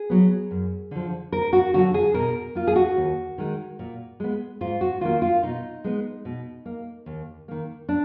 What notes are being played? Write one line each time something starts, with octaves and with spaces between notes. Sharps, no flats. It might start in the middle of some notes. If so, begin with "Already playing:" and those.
Already playing: G#4
F#3 B3
F#2
D3 F3
D2 A#4
F#4
D3 F#3 F#4
G#4
B2 A#4
A#3 F4
G#4
F#4
D#2
D#3 G#3
A#2
G#3 B3
G#2 F4
F#4
D#3 A#3 F4
F4
B2 D#4
G#3 B3
B2
A#3
D#2
D#3 A#3
D4